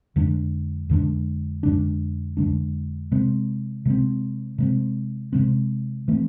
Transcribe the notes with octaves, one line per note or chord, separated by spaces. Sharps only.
F2 D3 G#3 D4
F2 D3 G#3 D4
F2 D3 G#3 D4
F2 D3 G#3 D4
C3 G#3 C4
C3 G#3 C4
C3 G#3 C4
C3 G#3 C4
E3 A3 C4